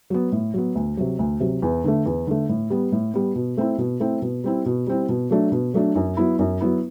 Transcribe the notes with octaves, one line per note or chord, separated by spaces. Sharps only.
F#3 B3
A2
F#3 B3
D2
C3 F#3
D2
C3 F#3
E2
D3 A3
E2
D3 A3
A2
G3 B3
A2
G3 B3
B2
A3 C4 E4
B2
A3 C4 E4
B2
G3 C4 E4
B2
G3 C4 E4
B2
F#3 A3 D4
B2
F#3 A3 D4
F#2
F#3 B3 E4
F#2
F#3 B3 E4